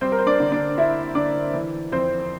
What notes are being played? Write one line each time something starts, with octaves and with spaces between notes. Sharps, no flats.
G3 C4 C5
A#4
C5
D4 D5
D3
D4 D5
D4 E4 E5
D3 D4 D5
E3
F2 C4 C5